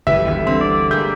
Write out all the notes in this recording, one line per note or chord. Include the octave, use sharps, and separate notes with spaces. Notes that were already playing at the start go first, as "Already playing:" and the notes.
F#1 A#2 E3 G4 A4 B4 E5
G1 D2 E3
D3 C4
D5
G3 G#3 A#3 E5 G6